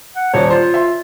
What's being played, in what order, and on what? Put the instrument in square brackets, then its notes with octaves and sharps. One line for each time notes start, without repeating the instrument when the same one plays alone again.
[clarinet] F#5
[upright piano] D#1 D5 [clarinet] C#5
[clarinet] F4 [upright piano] C5
[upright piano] E5 C6